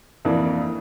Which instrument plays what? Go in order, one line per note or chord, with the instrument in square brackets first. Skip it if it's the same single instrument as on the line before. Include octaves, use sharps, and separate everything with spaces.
[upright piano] F2 E3 A#3 D4